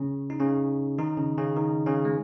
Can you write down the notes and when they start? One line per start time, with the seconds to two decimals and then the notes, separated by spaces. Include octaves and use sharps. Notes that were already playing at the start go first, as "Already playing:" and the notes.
Already playing: C#3 C#4
0.30 D#4
0.40 C#3 C#4
0.98 D#3 D#4
1.17 C#3 C#4
1.37 C#3 C#4
1.56 D#3 D#4
1.86 C#3 C#4
2.05 G#3